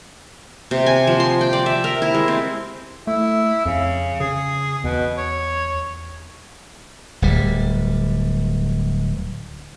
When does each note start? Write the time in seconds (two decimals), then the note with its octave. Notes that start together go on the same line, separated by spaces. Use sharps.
0.71 C3
0.86 G#5
1.07 F3
1.20 C6
1.41 G5
1.53 D5
1.66 E5
1.84 A#4
2.02 E4
2.14 G#3
2.28 C4
3.07 A3 E4
3.66 F2 C#3
4.20 C#3 G#4
4.84 E2 B2
5.18 C#5
7.22 D1 G3